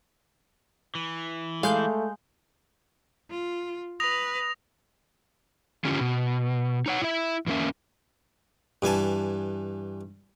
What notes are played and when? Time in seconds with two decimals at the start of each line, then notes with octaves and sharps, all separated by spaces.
0.95 E3
1.63 G#3 A3 F5 G6
3.29 F4
4.00 B4 D#6 A#6 F7
5.85 D3 C#4 F4 G4
6.01 B2
6.86 D#4 C#5 F#5
7.02 E4 E5
7.47 E2 A2 A#3 C#4 E5
8.82 G2 E3 G#5 A5